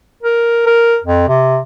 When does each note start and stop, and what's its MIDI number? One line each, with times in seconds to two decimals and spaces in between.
0.23 0.65 70
0.67 0.97 70
1.04 1.25 41
1.29 1.59 48